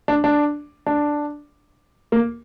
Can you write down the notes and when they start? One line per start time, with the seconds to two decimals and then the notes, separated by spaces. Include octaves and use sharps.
0.08 D4
0.24 D4
0.86 D4
2.12 A#3